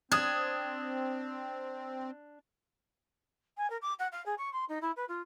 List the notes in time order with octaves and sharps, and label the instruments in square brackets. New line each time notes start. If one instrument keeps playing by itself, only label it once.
[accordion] C4 [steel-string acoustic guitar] D4 [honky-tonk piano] D#6 G#6
[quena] G#5
A#4
D6
F#5
F5
G#4
C#6
C6
D#4
E4
B4
F4